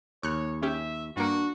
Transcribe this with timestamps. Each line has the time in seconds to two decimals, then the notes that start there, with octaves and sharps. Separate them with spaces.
0.23 D#2 C#5 C#6 F6 F#6
0.63 C#4 G4 E5
1.17 G2 A#3 D4 F#4